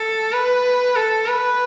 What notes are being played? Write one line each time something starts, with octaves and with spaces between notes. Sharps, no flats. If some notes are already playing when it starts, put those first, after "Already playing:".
Already playing: A4
B4
A4
B4